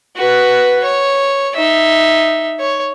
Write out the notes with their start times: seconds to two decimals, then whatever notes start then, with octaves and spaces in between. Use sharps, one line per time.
0.16 F#4 B4
0.84 C#5
1.56 D#4 E5
2.59 C#5